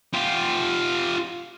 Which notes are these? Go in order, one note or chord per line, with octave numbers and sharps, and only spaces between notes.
F4 G4